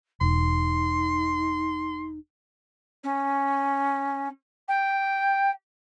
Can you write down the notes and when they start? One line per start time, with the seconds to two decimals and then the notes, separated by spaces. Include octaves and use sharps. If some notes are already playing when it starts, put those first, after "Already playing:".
0.21 E1 D#4 C6
3.03 C#4
4.68 G5